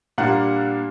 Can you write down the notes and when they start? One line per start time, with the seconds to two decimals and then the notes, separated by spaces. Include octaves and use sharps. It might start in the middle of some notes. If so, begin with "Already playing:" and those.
0.18 A#2 G3 A#3 D4 F#5